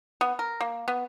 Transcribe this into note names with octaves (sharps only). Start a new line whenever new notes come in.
B3
A#4
A#3
B3